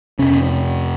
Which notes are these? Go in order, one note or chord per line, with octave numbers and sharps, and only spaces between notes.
F2 C3 C#4